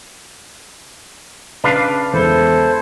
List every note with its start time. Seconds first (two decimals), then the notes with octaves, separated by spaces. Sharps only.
1.64 C#3 D4 B4 F5
2.13 E2 G#3 E4 A4 C5 G7